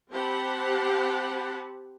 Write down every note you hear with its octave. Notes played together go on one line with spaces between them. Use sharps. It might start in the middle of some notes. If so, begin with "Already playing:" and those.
C4 G4 C5 F#5 A5 B5